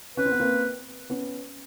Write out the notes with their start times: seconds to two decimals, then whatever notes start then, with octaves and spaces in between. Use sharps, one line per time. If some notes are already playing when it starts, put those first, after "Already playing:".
0.17 C#4 B4
0.25 C4
0.32 B3
0.39 A#3 C4
1.10 B3 C#4